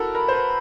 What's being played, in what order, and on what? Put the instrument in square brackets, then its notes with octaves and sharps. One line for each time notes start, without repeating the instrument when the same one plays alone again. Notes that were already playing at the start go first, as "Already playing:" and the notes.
Already playing: [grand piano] E4 F#4 A4 A#4
[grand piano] A#4 [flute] B5
[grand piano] C5
B4